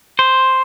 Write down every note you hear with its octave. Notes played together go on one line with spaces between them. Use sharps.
C5